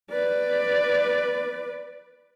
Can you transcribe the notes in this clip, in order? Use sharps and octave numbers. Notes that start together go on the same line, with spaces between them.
B4 D5